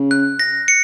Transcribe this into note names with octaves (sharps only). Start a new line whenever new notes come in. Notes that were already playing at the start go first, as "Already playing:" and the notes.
Already playing: C#3
F#6
A#6
C#7